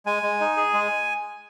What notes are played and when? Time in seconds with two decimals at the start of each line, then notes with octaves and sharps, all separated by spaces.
0.06 G#3 G#5
0.23 G#3
0.40 D#4
0.57 G#4
0.74 G#3